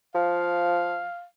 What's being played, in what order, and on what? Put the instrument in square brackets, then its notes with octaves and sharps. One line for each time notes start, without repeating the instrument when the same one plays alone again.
[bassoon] F3 [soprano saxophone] F5